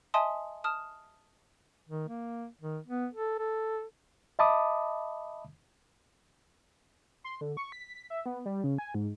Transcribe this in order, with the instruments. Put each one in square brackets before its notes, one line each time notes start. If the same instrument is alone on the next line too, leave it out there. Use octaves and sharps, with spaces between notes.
[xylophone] D#5 E5 G#5 A5 C6 D#6
A5 D#6 F6 E7
[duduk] D#3
A#3
D#3
B3
A4
A4
[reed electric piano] D#5 E5 A5 B5 D6 D#6
[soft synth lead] C6
D3
C#6
B6
E5
B3
G3
C#3
G#5
G#2